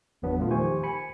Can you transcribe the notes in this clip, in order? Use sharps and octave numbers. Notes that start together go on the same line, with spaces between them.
G1 E2 F#3 B3 D4 B4
A#2 A3 F4
D#3 F3 G4 C5 G#5 C#6
G#5 B5 C#7